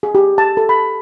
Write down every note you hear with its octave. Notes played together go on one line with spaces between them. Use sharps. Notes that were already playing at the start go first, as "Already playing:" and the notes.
G#4
G4
A5
A4
B5